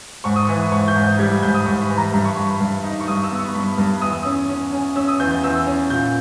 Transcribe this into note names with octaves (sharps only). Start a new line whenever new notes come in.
G#2 C#6
D#6
E3 C#6
G#2 C#6
G6
G#2
G6
G3 G#6
G#6
G#2 G6
D#6
G#2 C#6
B5
E3
A#5
G2 B5
C#6
G2 B5
G2
D#4
C#6
G2 D#6
E6
B3
C#6
G2 B5
G2
E2 D#6
E6
C#4 D#6
C#4
C#4
C#4 E6
D#6
E2 G6
G6
E2 E6
C#4
A#2 G6